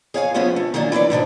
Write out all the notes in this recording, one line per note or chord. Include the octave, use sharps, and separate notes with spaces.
G#4 C#5 F5 G#5
F3 A3 B3 C#4 D4
A3
D#3 E3 F#3 A#3 C#4 D4
E3 C#4 B4 D5
A2 C3 D4 D#4